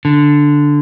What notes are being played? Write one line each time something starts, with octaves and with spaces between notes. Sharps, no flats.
D3